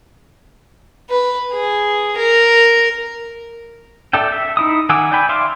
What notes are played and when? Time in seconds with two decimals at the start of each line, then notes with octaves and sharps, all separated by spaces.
1.10 B4
1.52 G#4
2.17 A#4
4.13 A4 D5 E5 G5
4.32 E5
4.57 D#4 E4 D#6
4.89 D#3 F#5 G#5 D6 E6
5.12 D5 G5 G#5 B5
5.29 D5 E5 F5 C6 D6